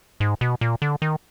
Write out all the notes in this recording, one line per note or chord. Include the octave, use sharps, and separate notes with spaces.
G#2
B2
A#2
D3
D#3